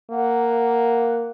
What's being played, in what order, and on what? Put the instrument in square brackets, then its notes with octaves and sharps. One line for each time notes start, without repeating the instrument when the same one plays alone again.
[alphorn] A#3 [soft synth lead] F#5